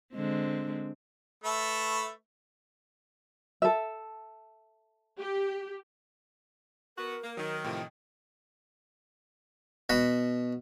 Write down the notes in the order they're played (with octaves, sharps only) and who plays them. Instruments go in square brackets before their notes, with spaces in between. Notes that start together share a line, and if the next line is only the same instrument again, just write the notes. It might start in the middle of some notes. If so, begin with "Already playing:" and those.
[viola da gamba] D3 G#3 C4
[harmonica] A3 B4 E5
[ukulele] A4 E5
[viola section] G4
[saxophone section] B3 F#4 [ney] A#4
[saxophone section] A#3
[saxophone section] D#3 [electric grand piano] F#3 D#4
[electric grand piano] A2 C3 F3 [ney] G5
[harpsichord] B2 F#4 B5